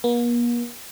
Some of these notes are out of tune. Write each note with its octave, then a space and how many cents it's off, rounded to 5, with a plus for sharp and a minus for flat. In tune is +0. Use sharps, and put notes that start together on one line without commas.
A#3 +45